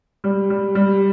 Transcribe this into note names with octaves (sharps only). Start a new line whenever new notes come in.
G3
G3
G3